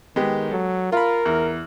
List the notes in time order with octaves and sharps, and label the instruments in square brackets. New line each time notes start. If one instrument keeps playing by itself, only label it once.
[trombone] D#3 [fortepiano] G#3 B3 G4
[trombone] F#3 [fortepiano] A4
[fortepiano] F4 B5 [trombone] A#4
[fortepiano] E2